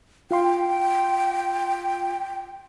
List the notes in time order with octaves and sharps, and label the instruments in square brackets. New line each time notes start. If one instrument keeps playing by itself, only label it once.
[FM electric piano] F4 F5 C6 [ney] G5